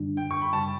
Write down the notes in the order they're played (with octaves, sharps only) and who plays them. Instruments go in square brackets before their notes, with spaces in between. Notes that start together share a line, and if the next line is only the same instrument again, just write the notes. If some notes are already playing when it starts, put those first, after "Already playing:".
Already playing: [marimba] F#2 D3 G3 D4
[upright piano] G5
C#6
B5
[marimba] F#2 C#3 G3 [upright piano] A5